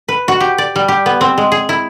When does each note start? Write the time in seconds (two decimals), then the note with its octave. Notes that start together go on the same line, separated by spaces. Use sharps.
0.09 B4
0.28 F#4
0.40 G4
0.58 D5
0.76 G3
0.88 G4
1.06 B3
1.21 C4
1.38 G#3
1.52 G#4
1.69 E4